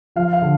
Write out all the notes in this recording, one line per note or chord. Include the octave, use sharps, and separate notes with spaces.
F3 F5
F5
D3